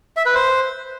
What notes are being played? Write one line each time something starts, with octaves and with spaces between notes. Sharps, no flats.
E5
B4
C5